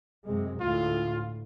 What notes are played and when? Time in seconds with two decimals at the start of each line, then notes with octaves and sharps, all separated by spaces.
0.24 F#2 C3 G#3
0.61 D2 A2 F4